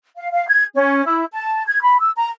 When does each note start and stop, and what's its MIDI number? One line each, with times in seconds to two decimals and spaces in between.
0.17 0.29 77
0.32 0.46 77
0.47 0.65 92
0.74 1.04 61
1.05 1.24 64
1.33 1.63 81
1.67 1.81 92
1.82 1.98 83
2.00 2.10 88
2.16 2.28 82